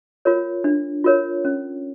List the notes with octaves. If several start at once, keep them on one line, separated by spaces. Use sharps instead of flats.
F4 A#4 C#5
D4
F4 A#4 C#5
C#4